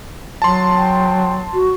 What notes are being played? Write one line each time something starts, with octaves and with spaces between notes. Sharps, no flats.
F#3 A5 C6
G5
F#4